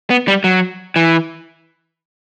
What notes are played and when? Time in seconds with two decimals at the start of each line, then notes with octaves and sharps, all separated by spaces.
0.10 B3
0.28 G3
0.44 F#3
0.96 E3